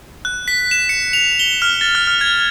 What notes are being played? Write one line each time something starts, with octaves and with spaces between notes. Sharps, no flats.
F#6
B6
E7
C#7
F7
G7
F6
A6
F6
F6
G#6